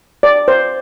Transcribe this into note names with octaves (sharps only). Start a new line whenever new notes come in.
D5
C5